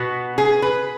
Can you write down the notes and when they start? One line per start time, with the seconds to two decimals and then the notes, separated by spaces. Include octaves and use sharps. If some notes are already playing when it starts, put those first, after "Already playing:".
Already playing: B2 B3 F#4
0.38 G#4
0.62 B4